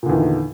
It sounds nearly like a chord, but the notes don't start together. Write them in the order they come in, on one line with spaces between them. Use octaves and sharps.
A#2 D3 E2 D#3